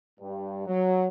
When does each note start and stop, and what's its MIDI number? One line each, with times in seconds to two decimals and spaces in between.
0.20 0.65 43
0.66 1.08 54